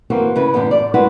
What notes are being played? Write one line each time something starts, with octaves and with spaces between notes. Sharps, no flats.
E3 A#3 C4 F#4
C#3 E4 B4
F#2 A2 D3 E3 B3
D5
G#3 A3 E4 F#4 B4 F#5